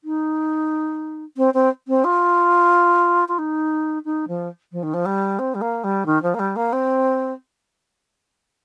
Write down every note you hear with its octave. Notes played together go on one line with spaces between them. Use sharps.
D#4
C4
C4
C4
F4
F4
D#4
D#4
F3
F3
D#3
F3
G3
C4
G3
A#3
G3
D#3
F3
A#3
G3
A#3
C4